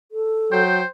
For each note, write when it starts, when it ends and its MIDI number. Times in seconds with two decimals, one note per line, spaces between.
0.12 0.62 69
0.52 0.83 54
0.52 0.88 72
0.52 0.84 79